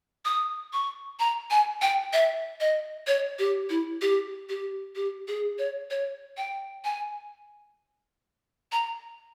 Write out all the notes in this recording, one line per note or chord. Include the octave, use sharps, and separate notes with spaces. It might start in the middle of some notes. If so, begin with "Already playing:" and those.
D#6
C#6
A#5
G#5
G5
E5
D#5
C#5
G4
E4
G4
G4
G4
G#4
C#5
C#5
G5
G#5
A#5